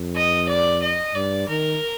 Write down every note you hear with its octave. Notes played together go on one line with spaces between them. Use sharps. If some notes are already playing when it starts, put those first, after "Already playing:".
Already playing: F2
D#5
D5
D#5
G2 D5
D#3 A#4